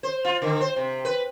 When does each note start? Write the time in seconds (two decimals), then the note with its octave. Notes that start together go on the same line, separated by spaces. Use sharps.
0.03 C5
0.25 F4
0.42 D3
0.61 C5
0.76 C3
1.05 B4